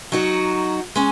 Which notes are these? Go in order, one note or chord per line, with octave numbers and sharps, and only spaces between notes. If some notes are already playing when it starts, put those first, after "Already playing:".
F#3 D#4 F#4
G#3 C#4